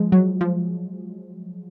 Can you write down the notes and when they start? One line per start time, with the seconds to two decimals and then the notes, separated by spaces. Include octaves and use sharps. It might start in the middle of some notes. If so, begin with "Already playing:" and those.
Already playing: F3 G#3
0.12 F#3
0.41 F3